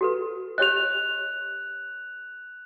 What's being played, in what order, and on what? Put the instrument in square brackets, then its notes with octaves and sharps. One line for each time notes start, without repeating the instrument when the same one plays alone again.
[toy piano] F#4 A4 B4
[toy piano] G4 C#5 D#5 [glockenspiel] F#6 F7